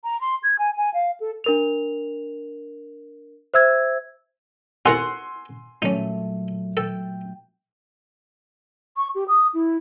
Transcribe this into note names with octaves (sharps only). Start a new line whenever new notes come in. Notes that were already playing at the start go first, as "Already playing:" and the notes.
A#5
C6
G#6
G#5
G#5
F5
A4
D4 A#4 F7
C5 E5 E6 G#6
D#4 A4 A#4 F#5 G#5 C6 E6 E7
A#2 F#3 A3 C#4 D#4
A4 G5
C#6
G4
D#6
E4